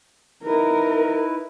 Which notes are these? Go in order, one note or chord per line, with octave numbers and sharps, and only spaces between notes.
D#4 E4 A#4 B4